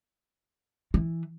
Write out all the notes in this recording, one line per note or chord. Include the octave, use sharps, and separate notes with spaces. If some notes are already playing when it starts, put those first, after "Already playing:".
E3